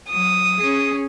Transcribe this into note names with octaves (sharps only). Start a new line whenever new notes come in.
F#3 D#6
C#4 G#4